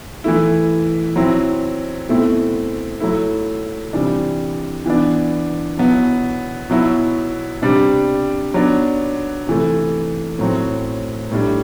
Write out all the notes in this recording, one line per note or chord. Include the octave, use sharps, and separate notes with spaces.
E3 A3 E4
F#3 C4 E4
B2 A3 C4 E4
F#3 A3 E4
C3 E3 G3 D4
E3 B3 D4
B2 F#3 B3 E4
B2 F#3 B3 E4
C3 G3 D4
F#3 B3 D4
C3 E3 A3
A2 F#3 C4
A2 G3 D4